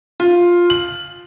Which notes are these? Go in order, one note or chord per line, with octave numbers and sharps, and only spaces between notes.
F4
F#7